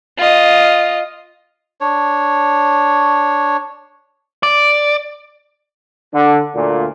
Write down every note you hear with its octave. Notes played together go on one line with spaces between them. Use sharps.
F4 D#5
D4 C#5
D5
D3
D2 A#2